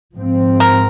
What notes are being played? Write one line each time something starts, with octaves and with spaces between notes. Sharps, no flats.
G#2 F3 C4
A#4